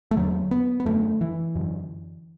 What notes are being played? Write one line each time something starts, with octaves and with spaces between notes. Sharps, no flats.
A3
E2 D3 F#3
B3
B3
F#2 D3 A3
E3
F#2 D3